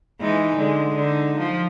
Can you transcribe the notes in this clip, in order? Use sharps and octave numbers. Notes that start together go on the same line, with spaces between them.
E3 G#3 D#4
D3 G#3
D3 D#4
F3